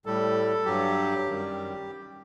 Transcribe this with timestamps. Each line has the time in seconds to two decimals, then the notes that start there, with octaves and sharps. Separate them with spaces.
0.06 A2 G3 A4
0.65 G2 F#3 G4
1.26 F#2 D#3 G3